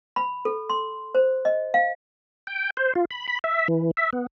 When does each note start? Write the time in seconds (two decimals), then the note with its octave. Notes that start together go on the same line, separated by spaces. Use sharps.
0.16 B5
0.45 A4
0.70 C6
1.15 C5
1.45 D#5
1.74 F5
2.47 G5
2.77 C5
2.95 F4
3.11 B5
3.28 B5
3.44 E5
3.68 E3
3.97 E5
4.13 B3